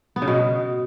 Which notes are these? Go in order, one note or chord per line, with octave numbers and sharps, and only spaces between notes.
B3
C#3
B2